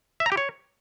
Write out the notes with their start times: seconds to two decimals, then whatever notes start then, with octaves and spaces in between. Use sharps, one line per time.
0.20 E5
0.26 A#5
0.32 G4
0.37 C#5